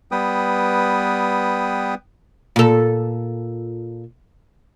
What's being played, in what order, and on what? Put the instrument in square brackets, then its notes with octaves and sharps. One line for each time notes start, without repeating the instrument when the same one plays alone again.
[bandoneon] G3 B3 B4 G5 D#6
[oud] A#2 A4